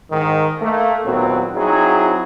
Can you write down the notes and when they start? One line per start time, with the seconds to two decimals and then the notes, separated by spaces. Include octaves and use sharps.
0.11 G#2 D#3
0.61 A3 A#3
1.05 D#2 A#2 F#3 B3 C4
1.56 F#3 C4 D#4 E4 G#4